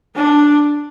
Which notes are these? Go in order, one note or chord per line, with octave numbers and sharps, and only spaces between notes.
D4